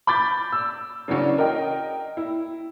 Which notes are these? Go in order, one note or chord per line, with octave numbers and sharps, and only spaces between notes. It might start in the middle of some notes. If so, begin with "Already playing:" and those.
B5 D6 G6 A6
E6
C#3 E3 F#3 C#4 D4
A#4 D#5 G5
E4